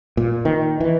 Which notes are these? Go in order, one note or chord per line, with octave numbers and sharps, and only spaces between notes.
A#2
D#3
E3